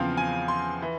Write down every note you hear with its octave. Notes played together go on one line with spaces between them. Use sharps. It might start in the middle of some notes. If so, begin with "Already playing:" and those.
Already playing: E2 C#3 F3 C4 F5
G#5
C6
E3